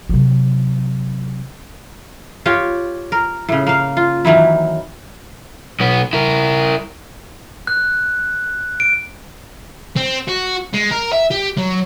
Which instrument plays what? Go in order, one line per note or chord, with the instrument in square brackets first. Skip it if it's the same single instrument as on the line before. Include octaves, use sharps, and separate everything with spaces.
[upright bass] C3 F#3
[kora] F4 G4 C#5
A#4
A2 C#3
A#3 F5
F4
D#3 E3 F#3 E4
[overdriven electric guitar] B1 B3
E4 A#4
[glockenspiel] F#6
D7
[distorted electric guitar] C4
F#4
G#3
A#4
E5
G4
F#3